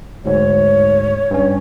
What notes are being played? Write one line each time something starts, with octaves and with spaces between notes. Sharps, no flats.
D2 G#2 C#5
G2 C#4